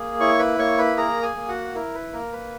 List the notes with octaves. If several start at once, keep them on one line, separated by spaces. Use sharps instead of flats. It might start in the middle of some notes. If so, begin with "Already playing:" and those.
Already playing: A#3 G#4
E4 C#5 C#6
B4 B5
A#3 C#5 C#6
B4 B5
G#4 A#4 A#5
G#4 G#5
A#3
F#4 F#5
E4 A#4
B4
A#3 A#4
B4